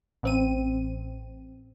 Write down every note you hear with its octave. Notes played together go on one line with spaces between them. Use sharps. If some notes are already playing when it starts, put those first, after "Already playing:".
A1 C4 D#7